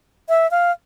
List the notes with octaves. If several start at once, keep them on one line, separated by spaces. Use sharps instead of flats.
E5
F5